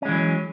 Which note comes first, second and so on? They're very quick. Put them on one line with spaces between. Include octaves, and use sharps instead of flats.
C#4 G#3 E3 F#3